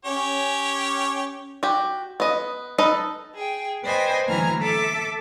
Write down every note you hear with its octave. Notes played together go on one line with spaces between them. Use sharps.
C#4 G4 C#5
F#4 G4
B3 D#5
D#4 A4 B4 D#5
G#4 G5
B4 C5 D5 D#5 G5 G#5
D2 E3 F#3 G#5 A#5 F6
A4 E5 A5 D6